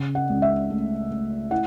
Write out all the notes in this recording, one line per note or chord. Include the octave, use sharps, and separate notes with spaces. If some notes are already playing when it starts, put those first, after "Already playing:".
Already playing: C#3
F#5
C#2
E5
A3
A3
E4 F#5